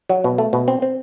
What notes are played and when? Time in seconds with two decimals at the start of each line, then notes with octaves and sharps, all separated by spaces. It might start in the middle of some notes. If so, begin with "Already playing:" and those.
0.09 F#3
0.24 B2
0.38 A3
0.53 B2
0.68 C4
0.82 C4